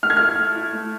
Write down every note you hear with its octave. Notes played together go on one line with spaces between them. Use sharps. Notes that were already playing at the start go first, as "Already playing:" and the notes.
A3 F6
G#6
E4 F6
A3
E4
A3